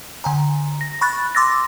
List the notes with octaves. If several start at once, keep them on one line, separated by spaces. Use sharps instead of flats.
D3 G#5 A#5
A#6
B5 C#6 F#6 A6
C6 D6 E6 A6 A#6